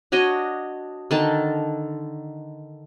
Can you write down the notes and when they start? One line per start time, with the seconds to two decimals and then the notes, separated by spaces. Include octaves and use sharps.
0.12 D4 F#4 C#5 D#5
1.11 D3 D#3 A5